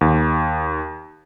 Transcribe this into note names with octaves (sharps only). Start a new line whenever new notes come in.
D#2